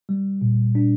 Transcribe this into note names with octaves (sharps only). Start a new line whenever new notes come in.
G3
A#2
D4